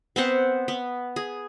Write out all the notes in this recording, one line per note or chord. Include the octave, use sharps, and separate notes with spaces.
B3 C4 C5 F#5
B3
G#4